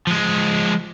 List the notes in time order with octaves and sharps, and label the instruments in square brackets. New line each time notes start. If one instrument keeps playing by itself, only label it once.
[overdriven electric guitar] F3 G#3